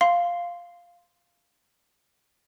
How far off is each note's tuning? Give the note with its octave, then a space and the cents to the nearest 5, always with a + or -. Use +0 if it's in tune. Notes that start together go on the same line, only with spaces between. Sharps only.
F5 +0 C6 +0